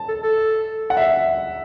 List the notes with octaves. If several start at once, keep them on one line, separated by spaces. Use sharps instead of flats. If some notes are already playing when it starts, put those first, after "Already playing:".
Already playing: A5
A4
A4
F#5
E5